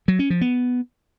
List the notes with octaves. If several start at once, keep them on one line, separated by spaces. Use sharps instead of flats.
F#3
C#4
F3
B3